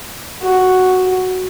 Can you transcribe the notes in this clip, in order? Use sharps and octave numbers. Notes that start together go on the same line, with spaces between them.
F#4